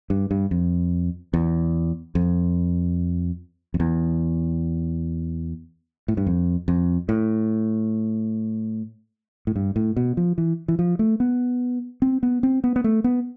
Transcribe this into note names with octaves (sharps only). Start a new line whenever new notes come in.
G2
G2
F2
E2
F2
F2
E2
A2
G2
F2
F2
A2
A2
G2
A2
B2
F3
E3
E3
F3
A3
B3
C4
B3
C4
B3
B3
A3
B3